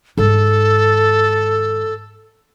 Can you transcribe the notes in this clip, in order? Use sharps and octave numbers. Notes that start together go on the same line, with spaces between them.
G#2 D#3 A4